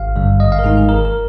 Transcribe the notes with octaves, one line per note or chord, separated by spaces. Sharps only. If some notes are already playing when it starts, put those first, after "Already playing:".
Already playing: G#1 F5
G2 D3 G3
G#1 D#5
F5
A#4
G#2 D#3 G#3 D#4 G#4
G#4
G1 A#4
A#4